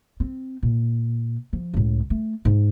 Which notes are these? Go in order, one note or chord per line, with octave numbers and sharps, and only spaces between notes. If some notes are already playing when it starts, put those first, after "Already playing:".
C4
A#2
F3
C#2 A2
A3
G#2